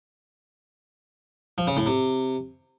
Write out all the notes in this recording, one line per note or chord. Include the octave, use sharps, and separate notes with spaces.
F3
C#3
A2
C3